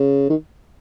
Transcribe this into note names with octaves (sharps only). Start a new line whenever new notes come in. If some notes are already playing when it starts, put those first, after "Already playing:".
Already playing: C#3
D#3